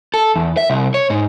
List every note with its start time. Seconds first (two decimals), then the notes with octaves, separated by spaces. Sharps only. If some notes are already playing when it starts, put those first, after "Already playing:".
0.14 A4
0.36 E2
0.57 E5
0.70 C2
0.94 C#5
1.10 G#2